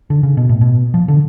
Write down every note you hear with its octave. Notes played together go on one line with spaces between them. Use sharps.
D3
C#3
B2
A2
B2
F3
D3